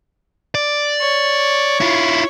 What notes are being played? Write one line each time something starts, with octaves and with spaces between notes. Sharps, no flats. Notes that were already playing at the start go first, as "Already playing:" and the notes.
D5
C#5
E4 F4